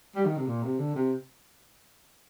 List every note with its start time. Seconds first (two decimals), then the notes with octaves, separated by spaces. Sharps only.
0.16 G3
0.26 D#3
0.37 C3
0.47 A#2
0.63 C3
0.79 D3
0.95 C3